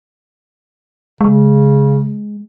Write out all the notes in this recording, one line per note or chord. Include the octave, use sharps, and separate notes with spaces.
C#3 G#3